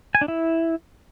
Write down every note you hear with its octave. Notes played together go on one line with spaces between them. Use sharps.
G#5
D4
E4